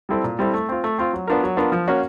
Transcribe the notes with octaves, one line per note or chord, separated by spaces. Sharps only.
G3 C4 E4 A4
A#2
G3 C4 E4 A4
A3
C4 F4
A3
C4 F4
F#3
B3 D4 F4 A#4
F#3
B3 D4 F4 A#4
F3
A#3 C#4 F#4